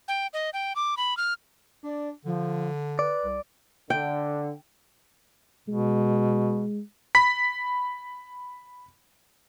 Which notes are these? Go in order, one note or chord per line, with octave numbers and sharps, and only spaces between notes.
G5
D#5
G5
D6
B5
F6
D4 D5
D3 F3
B4 D5
C2
D3 G5
B2 G#3
B5 B6